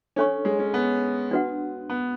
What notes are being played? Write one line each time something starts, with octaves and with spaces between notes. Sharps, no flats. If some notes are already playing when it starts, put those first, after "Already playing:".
C#4 D4 A4 C#5 G#5 C#6
G#3
C#4
B3
D4 F#4 B4 F#5
B3